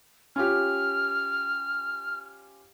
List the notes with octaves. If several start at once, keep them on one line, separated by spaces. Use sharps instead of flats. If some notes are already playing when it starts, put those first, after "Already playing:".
C#4 F4 G4 F6